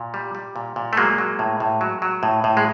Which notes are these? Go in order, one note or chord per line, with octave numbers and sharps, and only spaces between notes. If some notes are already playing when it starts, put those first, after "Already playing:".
Already playing: A#2
G3
G3
A#2
A#2
A3
F#3 G#3 A#3
F#3
A2
A2
F#3
F#3
A2
A2
G#3